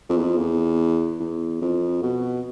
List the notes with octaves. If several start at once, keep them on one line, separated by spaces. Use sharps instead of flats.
F2
E2
F2
E2
E2
F2
B2